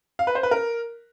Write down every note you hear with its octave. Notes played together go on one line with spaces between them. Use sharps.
F5
B4
C5
B4
A#4